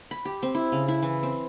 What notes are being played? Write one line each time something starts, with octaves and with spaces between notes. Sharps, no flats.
B5
G4
C4
E4
C#3
E4
E3
C4